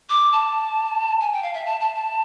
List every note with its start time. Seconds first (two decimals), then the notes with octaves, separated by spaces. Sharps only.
0.10 D6
0.33 A5
1.21 G#5
1.33 G5
1.43 F5
1.54 E5
1.65 A5
1.80 A5
1.95 A5